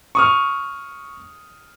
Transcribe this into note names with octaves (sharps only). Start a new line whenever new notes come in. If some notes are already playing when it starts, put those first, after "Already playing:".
C#6 D#6 F6